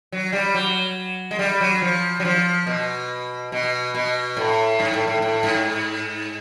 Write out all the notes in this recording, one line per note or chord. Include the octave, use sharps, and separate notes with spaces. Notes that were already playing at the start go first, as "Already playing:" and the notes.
F#3
G3
F#3
G#3
G3
F#3
F3
F#3
F3
B2
B2
B2
A2
G#2
A2
A2
A2
G#2